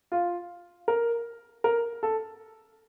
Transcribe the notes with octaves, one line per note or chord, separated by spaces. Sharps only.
F4
A#4
A#4
A4